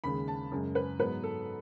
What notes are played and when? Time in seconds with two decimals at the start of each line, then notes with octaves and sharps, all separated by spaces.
0.04 D#2 C#3 G#3 B5
0.28 A5
0.52 F#2 C#3 G#3
0.75 B4
0.99 G#2 F#3 B3 B4
1.23 A4